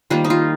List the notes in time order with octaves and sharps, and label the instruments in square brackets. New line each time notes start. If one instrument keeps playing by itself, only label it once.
[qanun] D#3 G3 A#3 F4
D#4
F4